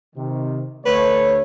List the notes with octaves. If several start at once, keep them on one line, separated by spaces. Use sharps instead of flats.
C3 D#3
D2 A3 B4 C#5